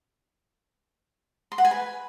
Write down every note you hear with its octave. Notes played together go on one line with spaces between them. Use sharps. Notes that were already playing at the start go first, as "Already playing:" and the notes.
C6
F#5
G#5
B4